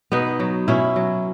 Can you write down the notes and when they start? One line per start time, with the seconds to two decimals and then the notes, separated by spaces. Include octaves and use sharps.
0.12 B2 B3 D#4
0.40 F#3
0.68 B2 C#4 E4
0.96 F#3